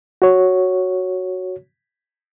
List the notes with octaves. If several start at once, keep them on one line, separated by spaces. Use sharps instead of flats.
F#4 C#5